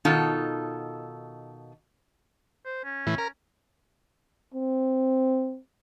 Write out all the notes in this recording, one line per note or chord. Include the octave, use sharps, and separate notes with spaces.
B2 D#3 D#4 F4 A4
C5
C#4
A2 E3
A#4
C4